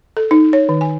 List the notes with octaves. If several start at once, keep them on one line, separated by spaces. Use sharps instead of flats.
A4
D#4
C#5
D#3
G#5